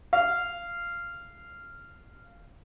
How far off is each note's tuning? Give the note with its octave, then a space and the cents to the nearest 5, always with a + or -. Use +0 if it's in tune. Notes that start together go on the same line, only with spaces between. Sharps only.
F5 -15